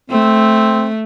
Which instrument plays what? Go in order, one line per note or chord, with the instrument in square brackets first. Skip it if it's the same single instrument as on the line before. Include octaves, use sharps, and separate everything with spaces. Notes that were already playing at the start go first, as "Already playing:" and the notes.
[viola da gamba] A3 [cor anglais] C4